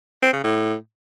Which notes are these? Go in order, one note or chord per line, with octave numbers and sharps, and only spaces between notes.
C4
C#3
A2